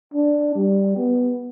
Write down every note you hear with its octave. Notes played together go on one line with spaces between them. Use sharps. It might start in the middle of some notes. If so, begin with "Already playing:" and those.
D4
G3
B3